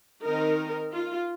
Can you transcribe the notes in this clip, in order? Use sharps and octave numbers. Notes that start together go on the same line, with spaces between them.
D#3 C4 D#4 A#4
F4